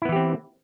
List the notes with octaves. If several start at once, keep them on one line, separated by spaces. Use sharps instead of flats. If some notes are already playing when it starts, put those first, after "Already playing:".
E3 B3 C4 E4 G4